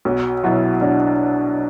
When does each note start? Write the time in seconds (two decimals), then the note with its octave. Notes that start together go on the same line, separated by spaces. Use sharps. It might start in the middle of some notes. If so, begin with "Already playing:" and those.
0.05 B1 F#4
0.44 B2 F#3 E4
0.81 B1 D4